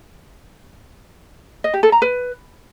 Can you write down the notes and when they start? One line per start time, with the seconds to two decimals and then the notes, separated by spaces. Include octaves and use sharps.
1.64 D#5
1.74 G4
1.83 A4
1.92 A#5
2.02 B4